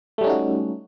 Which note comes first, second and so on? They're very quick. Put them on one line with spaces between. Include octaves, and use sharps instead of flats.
A3 G3 C#4 D#4 F#4